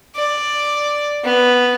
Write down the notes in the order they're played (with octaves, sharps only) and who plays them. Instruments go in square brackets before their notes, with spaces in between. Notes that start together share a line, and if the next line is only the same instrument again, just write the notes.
[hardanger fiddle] D5
B3